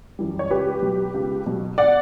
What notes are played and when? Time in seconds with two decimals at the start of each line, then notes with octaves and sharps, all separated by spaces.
0.19 F#2 E3 G3
0.39 C#5
0.50 C#2 G4 B4
0.82 B2 F#3
1.14 C#2
1.46 B2 F#3
1.78 D5 F#5